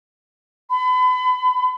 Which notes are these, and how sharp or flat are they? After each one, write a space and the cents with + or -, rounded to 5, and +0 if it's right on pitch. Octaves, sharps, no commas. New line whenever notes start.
B5 +35